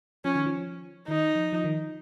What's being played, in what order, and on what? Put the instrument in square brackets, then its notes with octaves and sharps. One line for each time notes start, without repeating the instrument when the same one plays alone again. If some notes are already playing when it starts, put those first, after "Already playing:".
[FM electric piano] F3 [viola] C#4
[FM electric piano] D#3
F3
[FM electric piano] D#3 [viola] D#4
[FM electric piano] F3
F3
D#3